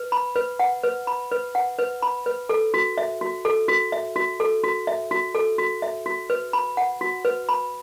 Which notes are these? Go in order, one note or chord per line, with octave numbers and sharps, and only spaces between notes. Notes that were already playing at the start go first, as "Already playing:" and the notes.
Already playing: B4
B5
B4
F#5
B4
B5
B4
F#5
B4
B5
B4
A4
F#4
E5
F#4
A4
F#4
E5
F#4
A4
F#4
E5
F#4
A4
F#4
E5
F#4
B4
B5
F#5
F#4
B4
B5